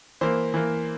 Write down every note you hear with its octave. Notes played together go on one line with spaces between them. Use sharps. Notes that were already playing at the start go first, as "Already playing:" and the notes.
E3 A#3 C5
E3 A#3